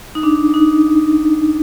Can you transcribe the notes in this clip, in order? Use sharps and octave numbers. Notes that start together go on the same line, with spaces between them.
D#4
D4
D#4